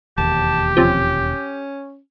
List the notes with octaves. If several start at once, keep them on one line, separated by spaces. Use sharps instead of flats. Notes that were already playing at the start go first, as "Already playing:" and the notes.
E1 D#2 G4 A5
C3 F3 C#4